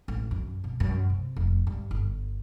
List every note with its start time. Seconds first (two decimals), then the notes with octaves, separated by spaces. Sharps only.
0.08 A1
0.31 F#2
0.64 B2
0.80 F#2
1.10 C3
1.36 F1
1.67 G2
1.91 G1